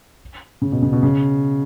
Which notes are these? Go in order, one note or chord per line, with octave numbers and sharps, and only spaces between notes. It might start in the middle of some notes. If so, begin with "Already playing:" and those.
C#3
B2
C#3
B2
C#3